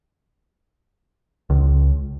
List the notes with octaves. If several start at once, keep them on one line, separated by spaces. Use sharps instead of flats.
C#2